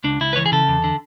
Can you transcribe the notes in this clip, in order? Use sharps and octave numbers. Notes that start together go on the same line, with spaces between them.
C#2 D4
C#2 E4
B4
E3 C#5
G#4
C#3 A4
E2
D3